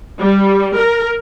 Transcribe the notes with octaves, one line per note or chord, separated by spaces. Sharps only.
G3
A#4